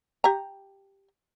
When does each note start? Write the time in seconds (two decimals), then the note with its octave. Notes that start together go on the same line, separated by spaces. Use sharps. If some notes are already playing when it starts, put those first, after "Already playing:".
0.24 G4 A#5